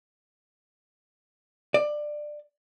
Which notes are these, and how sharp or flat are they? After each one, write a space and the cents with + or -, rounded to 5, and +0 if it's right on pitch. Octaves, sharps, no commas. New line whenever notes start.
D5 +20